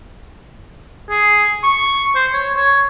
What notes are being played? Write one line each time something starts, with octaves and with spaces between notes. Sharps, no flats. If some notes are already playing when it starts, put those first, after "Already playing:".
G#4
C#6
C5
C#5
C#5